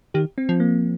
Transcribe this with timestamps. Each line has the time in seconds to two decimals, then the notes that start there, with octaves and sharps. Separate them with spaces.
0.14 D#3 G4
0.38 C4
0.49 F3
0.60 A#3